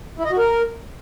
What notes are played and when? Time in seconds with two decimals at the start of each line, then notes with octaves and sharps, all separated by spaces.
0.18 E4
0.25 D#5
0.31 F#4
0.38 A#4